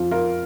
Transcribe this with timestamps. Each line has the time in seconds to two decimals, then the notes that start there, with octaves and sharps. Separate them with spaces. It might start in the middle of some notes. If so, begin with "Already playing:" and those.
Already playing: F2 F3 F4
0.11 F4 A#4